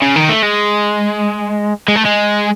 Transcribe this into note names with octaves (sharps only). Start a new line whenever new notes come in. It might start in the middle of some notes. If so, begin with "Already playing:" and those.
C#3
D#3
A3
G#3
G#3
A3
G#3